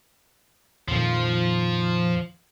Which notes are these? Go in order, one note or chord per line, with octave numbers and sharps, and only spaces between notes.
F2 A#2 D#3 F3 F4